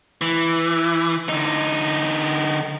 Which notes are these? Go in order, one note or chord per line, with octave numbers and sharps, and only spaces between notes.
E3
D3 D#4